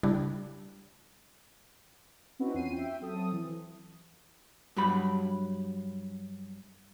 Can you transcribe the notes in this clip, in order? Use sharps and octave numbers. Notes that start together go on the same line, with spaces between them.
C#3 G3 D4 E4 G4
C4 C#4 D#4 E4 F#4 B4
E2 C#4 F4 C7 D#7
E5 G5
F#3 C4 A4 D#6
E3
G2 F#3 B5